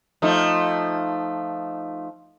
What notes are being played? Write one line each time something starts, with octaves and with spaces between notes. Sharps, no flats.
F3 A3 D#4